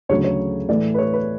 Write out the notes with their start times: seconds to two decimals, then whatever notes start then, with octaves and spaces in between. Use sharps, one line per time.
0.09 D2 C#3 F#3 A3 C#5
0.24 C#5
0.69 A2 E3 A3 D5
0.94 B4
0.98 C#5
1.13 B4